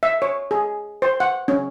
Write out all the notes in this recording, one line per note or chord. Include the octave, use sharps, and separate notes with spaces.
E5
C#5
G#4
C5
F#5
C#4